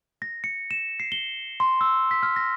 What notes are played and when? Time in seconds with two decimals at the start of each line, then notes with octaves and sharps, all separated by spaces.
0.22 A#6
0.44 C#7
0.71 E7
1.00 C7
1.12 G7
1.60 C6
1.81 E6
2.11 B6
2.23 F6
2.36 A#6